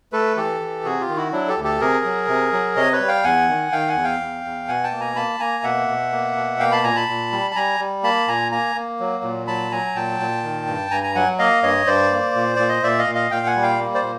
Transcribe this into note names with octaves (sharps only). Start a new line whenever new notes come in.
A3 A4 B4
E3 G4 A4
E3
C3 F#4 G#4
F4 G4
D#3
E4 F#4
F#3 D4 E4
G4 A4
D2
G4 A4
C3 G#4 A#4
F#3
C3
F#3
C3 C#5 D#5
B4 C#5
G3
F5 G5
E2 F#5 G#5
D#3
D#3 F5 G5
F#5 G#5
E2
F5 G5
E2
E2
B2 F#5 G#5
G5 A5
A#3
G#5 A#5
A#3 A5 B5
A#3 G#5 A#5
B2 E5 F#5
B2
A#3
B2
A#3 F5 G5
A5 B5
A#2 G#5 A#5
A5 B5
A#2
G3
A5
G3 G#5 A#5
G3
A#3 A5 B5
A#2 G#5 A#5
A#3 G#5 A#5
A#3
F#3
A#2
F#3 A5 B5
F#3 G#5 A#5
A#2 G5 A5
A#2
D#3
G2
G2 G#5 A#5
G#5 A#5
F#3 F#5 G#5
A#3 D#5 F5
G2 C#5 D#5
G2 C5 D5
A#3
A#2
A#2 D5
D#5
A#2 D5 E5
D#5 F5
A#2
D#5 F5
A#2 F5 G5
F#5 G#5
G3
F5 G5
A#3
C5 D5
A#2